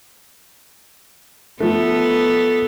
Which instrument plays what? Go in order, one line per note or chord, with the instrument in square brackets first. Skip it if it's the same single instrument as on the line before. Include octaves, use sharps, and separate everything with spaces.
[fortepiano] F3 A3 [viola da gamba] B3 A4